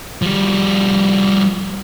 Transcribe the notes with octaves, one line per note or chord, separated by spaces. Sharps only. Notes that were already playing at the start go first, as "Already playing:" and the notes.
F3 G3